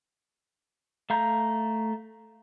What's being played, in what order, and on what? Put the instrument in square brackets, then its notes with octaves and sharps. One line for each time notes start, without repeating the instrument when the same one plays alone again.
[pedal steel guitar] A3 F5 A#5 G6